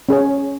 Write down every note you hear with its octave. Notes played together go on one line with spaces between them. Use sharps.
C#4 G#4 C#5